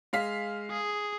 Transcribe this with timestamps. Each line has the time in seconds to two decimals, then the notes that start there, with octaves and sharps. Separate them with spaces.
0.13 G#3 F5 B6
0.70 G#4